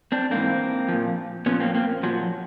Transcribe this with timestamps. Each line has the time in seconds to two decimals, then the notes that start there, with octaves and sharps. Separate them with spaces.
0.12 C4 D4
0.31 G#2 E3 A#3 C4
0.88 A#2 F3
1.46 A#2 F3 B3 C#4
1.60 A#3 C4
1.75 A#3 C4
2.03 A#2 F3 F#3